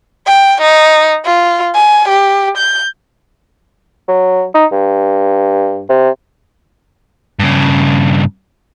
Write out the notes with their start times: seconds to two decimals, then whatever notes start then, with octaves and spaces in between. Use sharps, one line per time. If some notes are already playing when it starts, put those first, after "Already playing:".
0.26 G5
0.61 D#4
1.25 F4
1.75 G#5
2.08 G4
2.58 G6
4.08 F#3
4.54 D#4
4.72 G2
5.89 C3
7.39 G2 C#3